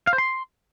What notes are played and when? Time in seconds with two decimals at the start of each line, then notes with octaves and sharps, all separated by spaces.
0.07 F5
0.13 C5
0.18 C6